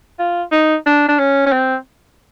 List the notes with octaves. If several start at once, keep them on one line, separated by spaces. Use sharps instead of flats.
F4
D#4
D4
D4
C#4
C#4
C4